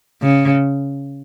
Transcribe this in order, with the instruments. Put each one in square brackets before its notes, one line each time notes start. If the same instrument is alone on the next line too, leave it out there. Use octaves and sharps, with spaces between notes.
[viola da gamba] C#3